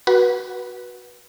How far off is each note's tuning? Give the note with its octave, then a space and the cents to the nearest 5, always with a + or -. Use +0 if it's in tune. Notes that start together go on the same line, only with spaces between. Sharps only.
F#4 +0 B4 -25